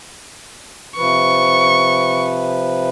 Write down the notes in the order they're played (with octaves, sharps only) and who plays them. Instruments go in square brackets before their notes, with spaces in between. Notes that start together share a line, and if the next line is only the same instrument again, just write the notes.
[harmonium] C3 F3 B4 [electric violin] C#6